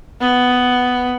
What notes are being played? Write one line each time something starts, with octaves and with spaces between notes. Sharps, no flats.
B3